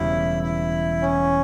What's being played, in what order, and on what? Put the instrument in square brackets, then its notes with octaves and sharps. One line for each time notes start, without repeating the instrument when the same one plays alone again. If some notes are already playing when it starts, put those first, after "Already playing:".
Already playing: [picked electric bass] E1 E2 C#3 G3 [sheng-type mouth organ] E4
[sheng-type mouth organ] E4
C#4